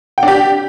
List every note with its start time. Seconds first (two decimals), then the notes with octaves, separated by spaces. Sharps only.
0.18 G5
0.23 D4
0.28 G4